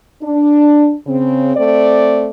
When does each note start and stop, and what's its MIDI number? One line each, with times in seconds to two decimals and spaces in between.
0.22 0.93 62
1.07 1.54 49
1.07 1.54 60
1.55 2.28 57
1.55 2.28 60
1.55 2.28 74